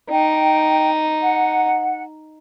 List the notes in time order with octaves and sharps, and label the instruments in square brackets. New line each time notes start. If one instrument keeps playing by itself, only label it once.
[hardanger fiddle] D#4 [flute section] G5
[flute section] F#5